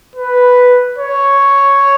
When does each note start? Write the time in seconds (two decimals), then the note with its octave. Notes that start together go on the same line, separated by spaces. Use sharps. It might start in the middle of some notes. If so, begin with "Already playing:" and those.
0.15 B4
0.98 C#5